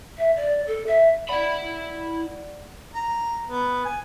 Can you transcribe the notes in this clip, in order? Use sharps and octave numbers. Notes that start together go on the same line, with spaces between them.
E5
D5
A4
E5
E4 D5 F#5 B5
A#5
B3
G#5